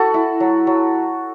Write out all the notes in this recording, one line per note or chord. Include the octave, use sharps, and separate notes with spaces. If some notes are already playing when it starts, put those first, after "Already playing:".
Already playing: F#4 A4
E4
F#3
F#3